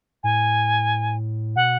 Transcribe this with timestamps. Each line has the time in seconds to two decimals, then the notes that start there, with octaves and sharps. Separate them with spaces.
0.24 A2 G#5
1.56 B2 F#5